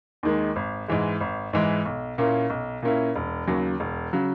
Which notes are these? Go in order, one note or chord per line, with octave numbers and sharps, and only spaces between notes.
D#2 D#3 G#3
G#1
G#2 E3 G#3
G#1
G#2 E3 G#3
B1
A#2 A#3 C#4 E4
B1
A#2 A#3 C#4 E4
E1
D#2 C#3 F#3
E1
C#3 F#3